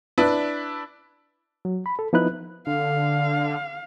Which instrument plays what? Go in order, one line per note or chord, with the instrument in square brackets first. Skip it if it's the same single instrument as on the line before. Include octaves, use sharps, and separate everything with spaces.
[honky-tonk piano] D4 E4 B4 E5
[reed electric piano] F#3
B5
A4
F3 B3 D#4 E4 B4 F#6
[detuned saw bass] D3 [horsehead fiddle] F5